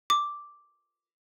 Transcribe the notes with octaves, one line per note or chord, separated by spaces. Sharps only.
D6